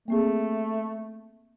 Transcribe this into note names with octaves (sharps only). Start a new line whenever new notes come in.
A3 A#3 C4 G#4